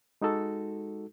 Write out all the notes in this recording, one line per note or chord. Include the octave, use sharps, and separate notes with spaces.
G#3 D#4 F#4 A4